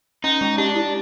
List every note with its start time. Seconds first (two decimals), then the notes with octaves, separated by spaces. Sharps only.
0.24 C#4 D#4
0.41 G#3
0.58 D4 G4
0.75 E4